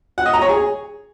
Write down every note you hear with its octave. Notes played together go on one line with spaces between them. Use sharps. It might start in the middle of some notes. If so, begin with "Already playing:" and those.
F#5
D#5
A#5
C#5
G#4